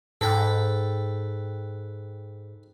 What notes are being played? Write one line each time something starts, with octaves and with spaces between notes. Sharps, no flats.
G#2 A4 B4 G5